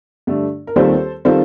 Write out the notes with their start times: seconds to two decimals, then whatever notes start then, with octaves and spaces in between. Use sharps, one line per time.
0.27 G2 D3 A3 D4
0.67 A#4
0.76 D#2 D#3 G3 C4 F4 A4 C5
1.25 D#3 G3 C4 F4 A4 C5